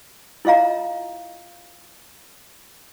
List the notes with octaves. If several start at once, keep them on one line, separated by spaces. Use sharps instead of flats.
E4 F4 D#5 F5 A#5